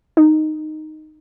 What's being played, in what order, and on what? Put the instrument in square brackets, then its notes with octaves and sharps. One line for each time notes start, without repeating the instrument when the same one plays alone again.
[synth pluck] D#4